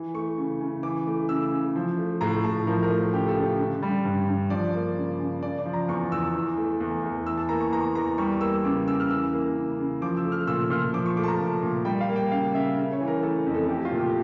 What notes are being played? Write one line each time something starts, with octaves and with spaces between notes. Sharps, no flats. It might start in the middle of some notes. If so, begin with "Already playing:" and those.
Already playing: E3
A3 C#6
C#3
C#3
E3 D6
A3
C#3 E6
C#3
F3
A3
A2 A#5
A2 A5
F3 A#4
A#4
A3
C#3 G4
A4
C#3
D3
G3
G2
G2
F3 D5
A#3
C#3
C#3
C#3 D5
D5
F3
A#5
E2 C#6
E2 E6
E3
A3
E2
E2
E3 E6
A5
A#3 A#5
C#6
E2 A#5
E2 A#5
G3 C#6
A#3 E6
C#3 D6
C#3 E6
F6
E3 E6
A#3
C#3
C#3
F3 D6
E6
A3
F6
A#2 E6
A#2 F6
F3 D6
C#6
A3 D6
A5
A#5
A#2
A#2
G3 G5
F5
A#3
G5
C#3 F5
C#3 E5
C#3
C#5
E3
A#4
A3 A4
F2
A4
A3 G4
F4
A#2
G4